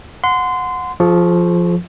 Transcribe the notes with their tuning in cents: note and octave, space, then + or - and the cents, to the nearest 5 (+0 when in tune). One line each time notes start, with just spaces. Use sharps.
F#5 -20 C6 -25
F3 +0 G#4 +45 C#6 +0